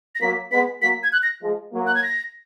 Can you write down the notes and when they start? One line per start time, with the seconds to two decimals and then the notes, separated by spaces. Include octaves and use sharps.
0.15 A#6
0.21 F#3 A#3 B6
0.51 G#3 B3 B6
0.82 F#3 A#3 B6
1.03 G#6
1.13 F#6
1.23 A#6
1.43 F3 G#3
1.74 F#3 A#3
1.87 F#6
1.95 G#6
2.03 A#6